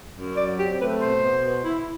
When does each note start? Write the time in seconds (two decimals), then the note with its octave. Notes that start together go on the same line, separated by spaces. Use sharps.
0.15 F#2
0.36 F#3 D5
0.57 C4 G4
0.79 A3 B4
1.00 B2 C5
1.21 B2
1.42 B2
1.64 E4